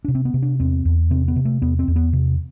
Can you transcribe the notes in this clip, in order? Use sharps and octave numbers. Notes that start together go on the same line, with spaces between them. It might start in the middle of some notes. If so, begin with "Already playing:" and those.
C3 D4
C4
B3
C3
D4
E2 C4
E2
C3 C4
B3
C3
A3
E2 B3
C4
E2
B3
C3